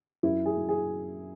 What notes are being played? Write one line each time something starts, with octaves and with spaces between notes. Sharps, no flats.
F#2 E4
G#4
F#3
G#4